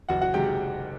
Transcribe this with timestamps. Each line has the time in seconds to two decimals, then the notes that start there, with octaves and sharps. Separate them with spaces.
0.09 F#1 F#4 F#5
0.21 F#4 F#5
0.34 C3 D#3 G#3 G4 G5